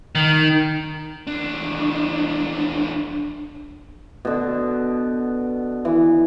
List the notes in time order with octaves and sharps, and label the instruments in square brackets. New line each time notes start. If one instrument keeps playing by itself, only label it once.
[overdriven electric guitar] D#3
[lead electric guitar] E2 D4
[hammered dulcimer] B2 D3
E3